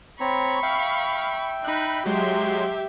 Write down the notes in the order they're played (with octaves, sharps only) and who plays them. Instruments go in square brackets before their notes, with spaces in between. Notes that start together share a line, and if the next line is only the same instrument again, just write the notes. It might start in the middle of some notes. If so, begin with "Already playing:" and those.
[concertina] C4 C#5 A#5 [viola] B5 C#6
[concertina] E5 G5 [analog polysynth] F5
[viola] D#4 [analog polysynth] B5 F#6
[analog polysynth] F#3 G#3 C6 [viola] G4 E5